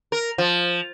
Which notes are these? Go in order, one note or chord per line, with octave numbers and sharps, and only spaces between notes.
A#4
F3